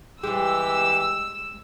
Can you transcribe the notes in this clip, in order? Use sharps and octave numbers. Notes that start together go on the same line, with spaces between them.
E3 G3 G#3 G4 E6